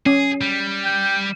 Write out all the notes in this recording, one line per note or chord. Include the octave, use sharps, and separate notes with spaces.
C#4 G#4
G3
G5